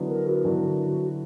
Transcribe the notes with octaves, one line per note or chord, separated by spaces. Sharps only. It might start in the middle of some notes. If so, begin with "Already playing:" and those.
Already playing: D3 F#3 B3 E4
A#4
F#4
D3 F#3 B3 E4